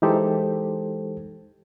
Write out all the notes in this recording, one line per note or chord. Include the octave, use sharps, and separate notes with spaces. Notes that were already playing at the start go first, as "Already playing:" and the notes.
E3 G#3 D#4 G4 A4 C5